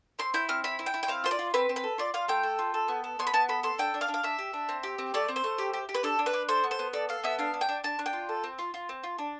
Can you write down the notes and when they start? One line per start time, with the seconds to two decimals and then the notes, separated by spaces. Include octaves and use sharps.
0.19 C4 C6
0.34 E4 G6
0.49 C4 F6
0.64 E4 B5
0.79 E4
0.86 G5
0.94 E4
1.03 G5
1.08 C4 F5
1.24 F4 C5
1.31 D5
1.39 F4
1.54 C4 B4
1.69 C4
1.76 B4
1.84 A4
1.98 F4 D5
2.14 F4 F5
2.28 A3 G5
2.43 A4
2.59 F4
2.74 A4
2.88 B3
3.04 A4
3.19 B3 C6
3.27 B5
3.34 B3 A5
3.49 A4 B5
3.63 A4 C6
3.79 D4 G5
3.94 D4
4.01 F5
4.08 D4
4.14 F5
4.23 D4 E5
4.39 G4
4.53 D4
4.69 C4
4.83 G4
4.98 C4
5.14 A3 D5
5.28 C4
5.36 C5
5.44 A3
5.58 G4
5.73 G4
5.89 G4
5.94 B4
6.03 D4 A4
6.19 D4
6.26 B4
6.33 D4
6.49 A4 C5
6.64 B3
6.71 C5
6.79 B3
6.93 A4 D5
7.09 A4 F5
7.24 B3 E5
7.39 D4 F5
7.54 D4
7.61 G5
7.69 D4
7.84 D4 A5
7.99 D4
8.06 G5
8.13 F4
8.29 A4
8.44 C4
8.59 F4
8.74 F4
8.89 C4
9.03 F4
9.18 D4